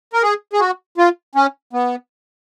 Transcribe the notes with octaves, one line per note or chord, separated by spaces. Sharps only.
A#4
G#4
G#4
F#4
F4
C#4
B3